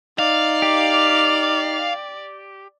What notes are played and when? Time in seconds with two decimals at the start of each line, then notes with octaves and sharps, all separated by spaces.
0.19 D#4 D5 F5
0.62 G4